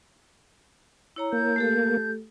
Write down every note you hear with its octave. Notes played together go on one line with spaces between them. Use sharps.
E4 C#5 A#5
A#3 G6
A3 G4 A4